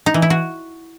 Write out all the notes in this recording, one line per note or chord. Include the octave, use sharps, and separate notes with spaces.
D#4
E3
E4
F#4